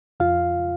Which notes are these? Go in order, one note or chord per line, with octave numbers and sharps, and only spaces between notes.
F2 F4 F5